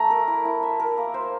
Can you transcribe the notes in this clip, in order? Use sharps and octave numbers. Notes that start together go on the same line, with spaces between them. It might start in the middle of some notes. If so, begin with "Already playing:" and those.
Already playing: A3 A#5
A#4
E4
E4
E5
A#4
A#3
C5